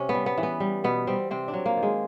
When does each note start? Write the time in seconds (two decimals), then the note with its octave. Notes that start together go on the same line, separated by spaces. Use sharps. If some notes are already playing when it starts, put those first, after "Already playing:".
Already playing: C3 C#4
0.09 B3
0.14 G3
0.26 B3
0.38 E3
0.43 B3
0.60 G3
0.84 B2 B3
1.07 G3 C4
1.31 C3 C4
1.48 D4
1.54 F#3
1.66 A#3
1.77 D#3
1.83 G#3